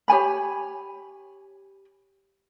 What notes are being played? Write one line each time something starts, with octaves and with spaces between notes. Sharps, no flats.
G4 C#5 G#5 B5